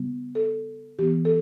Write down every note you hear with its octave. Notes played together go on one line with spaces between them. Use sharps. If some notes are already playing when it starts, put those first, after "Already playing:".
Already playing: C#3 G3 B3
A4
E3 B3 G4
A4